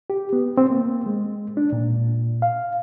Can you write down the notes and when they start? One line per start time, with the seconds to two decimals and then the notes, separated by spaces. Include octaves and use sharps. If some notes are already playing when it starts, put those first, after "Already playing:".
0.10 G4
0.33 B3
0.57 C4
0.70 A#3
1.06 G#3
1.57 D4
1.73 A#2
2.42 F5